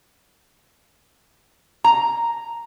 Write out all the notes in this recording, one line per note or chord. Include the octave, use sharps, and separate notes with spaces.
A#5